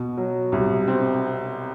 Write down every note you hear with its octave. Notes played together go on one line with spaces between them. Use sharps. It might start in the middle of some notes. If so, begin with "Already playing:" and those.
Already playing: B2
F#3
C2
C4